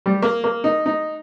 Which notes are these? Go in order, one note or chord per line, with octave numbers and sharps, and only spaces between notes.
G3
A#3
A#3
D#4
D#4